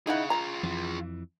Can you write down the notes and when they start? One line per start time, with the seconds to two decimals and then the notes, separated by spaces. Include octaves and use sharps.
0.07 D#4 E4 G#4 F5 F#5
0.30 F4 G#4 A#5
0.63 F2 E3